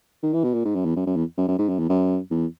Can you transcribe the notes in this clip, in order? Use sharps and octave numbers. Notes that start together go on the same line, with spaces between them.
D#3
E3
B2
A#2
G#2
F#2
E2
F#2
F#2
E2
F#2
F#2
G#2
F#2
E2
F#2
E2